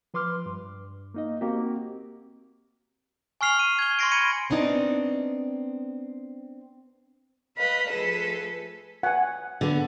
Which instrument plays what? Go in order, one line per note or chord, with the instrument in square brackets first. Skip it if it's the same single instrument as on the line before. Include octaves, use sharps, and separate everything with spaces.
[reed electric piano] F3 B4 C6 D6 F6
G2
A#3 D#4 D#5
A#3 C4 F#4 G4
[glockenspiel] G#5 C#6 F6 C7 F7
D#7
G#6 G7
C6 C#6 G#6 A#6 C7 D7
B5 G#6 C#7 D#7
[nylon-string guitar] B3 C4 D4 D#4
[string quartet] B4 D#5 F5 B5
F3 A3 G#4 A4 B4
[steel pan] F#5 G#5
[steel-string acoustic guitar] D3 B3